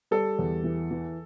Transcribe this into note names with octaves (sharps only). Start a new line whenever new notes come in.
G3 A4
E2
E3
E3